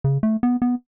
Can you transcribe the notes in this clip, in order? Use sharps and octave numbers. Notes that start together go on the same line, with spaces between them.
C#3
A3
B3
B3